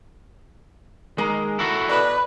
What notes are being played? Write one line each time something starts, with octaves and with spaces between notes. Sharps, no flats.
D#3 G#3 A#3 A#4
E4 F#4 A4
B2 B4 D5